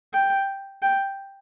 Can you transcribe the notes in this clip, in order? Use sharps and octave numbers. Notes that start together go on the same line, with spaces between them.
G5
G5